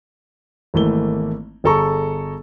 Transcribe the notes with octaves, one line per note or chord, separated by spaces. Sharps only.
G#1 E3 A3 A#3 G7
G1 G#4 A4 A#5 C#6